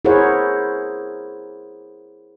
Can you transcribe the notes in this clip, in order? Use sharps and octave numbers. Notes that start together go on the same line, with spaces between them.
E4 G#4 A#4 C5 C#5 F#5